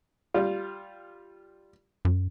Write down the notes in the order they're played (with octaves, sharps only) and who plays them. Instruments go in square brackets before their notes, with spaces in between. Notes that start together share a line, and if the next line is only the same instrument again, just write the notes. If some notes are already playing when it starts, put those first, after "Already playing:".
[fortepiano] G3 F4
[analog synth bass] F#2